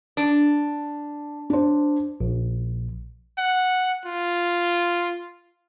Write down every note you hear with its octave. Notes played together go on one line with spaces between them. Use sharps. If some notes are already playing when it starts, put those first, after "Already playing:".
D4
D4 C5
A#1
F#5
F4